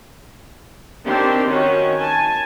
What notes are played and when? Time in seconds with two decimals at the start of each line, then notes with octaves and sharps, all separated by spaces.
1.06 D#3 C4 D4 G4 C6
1.47 D#3 C#4 F#4
1.98 G#5 A5